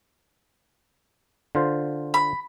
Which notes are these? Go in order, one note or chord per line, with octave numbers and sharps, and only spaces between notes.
D3 F4 C5
B5